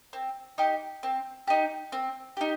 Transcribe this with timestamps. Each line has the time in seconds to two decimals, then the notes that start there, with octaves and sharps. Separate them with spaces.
0.13 C4
0.58 D#4 G4
1.03 C4
1.47 D#4 G4
1.92 C4
2.37 D#4 G4